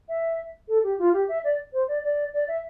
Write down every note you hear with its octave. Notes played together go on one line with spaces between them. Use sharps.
E5
A4
G4
F4
G4
E5
D5
C5
D5
D5
D5
E5